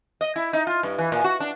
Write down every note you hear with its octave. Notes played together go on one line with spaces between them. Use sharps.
D#5
E4
D#4
F4
G2
E3
A#2
F#4
D4